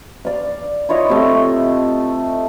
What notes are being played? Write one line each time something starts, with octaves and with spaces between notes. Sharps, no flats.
D5 F5
E4 F4 C#5 D#5
C3 A3